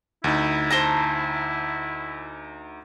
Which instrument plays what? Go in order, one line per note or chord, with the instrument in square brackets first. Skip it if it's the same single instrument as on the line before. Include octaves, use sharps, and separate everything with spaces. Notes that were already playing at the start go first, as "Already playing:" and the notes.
[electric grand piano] D2 D#4 [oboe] E4
[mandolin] C5 A5 A#5